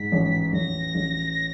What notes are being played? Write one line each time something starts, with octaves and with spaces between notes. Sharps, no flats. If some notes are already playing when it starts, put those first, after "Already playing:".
Already playing: G#2 B6
A1
A1 A#6
A1